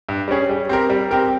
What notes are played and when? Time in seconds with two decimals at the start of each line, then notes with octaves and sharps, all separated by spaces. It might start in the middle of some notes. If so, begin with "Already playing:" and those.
0.09 G2
0.28 G3 C#4 G#4
0.49 G3
0.69 C4 G4 A#4
0.90 G3
1.11 C4 G4 A#4